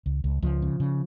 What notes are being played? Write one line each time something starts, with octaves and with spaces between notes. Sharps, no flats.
C#2
C#2
C#2 F3
C#3
C#3